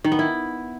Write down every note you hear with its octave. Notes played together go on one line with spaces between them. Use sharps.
D#3
B3
E4